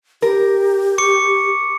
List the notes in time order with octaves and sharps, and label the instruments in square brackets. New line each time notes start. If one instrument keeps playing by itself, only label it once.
[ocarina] G4 [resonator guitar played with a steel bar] A#4
[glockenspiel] C#6 D6 C#7